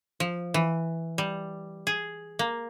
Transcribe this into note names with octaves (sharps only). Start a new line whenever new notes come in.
F3
E3
G3
G#4
A#3